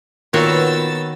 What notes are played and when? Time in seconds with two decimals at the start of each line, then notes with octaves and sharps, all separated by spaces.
0.34 A#2 D#3 B3 F#4 C#5 E6 A6